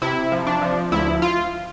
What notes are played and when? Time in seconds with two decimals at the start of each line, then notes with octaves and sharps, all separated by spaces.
0.02 C3 E4
0.32 F3
0.47 D4
0.62 F3
0.92 D2 E4
1.22 F4